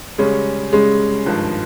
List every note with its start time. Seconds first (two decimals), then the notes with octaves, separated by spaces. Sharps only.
0.18 C#3 G3 G#3 C#4
0.73 C#3 G3 G#3 C#4
1.26 G#1 G2 F3